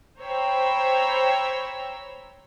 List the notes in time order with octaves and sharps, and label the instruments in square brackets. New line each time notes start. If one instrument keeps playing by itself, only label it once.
[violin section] C5 C#5 G5 A#5 B5 E6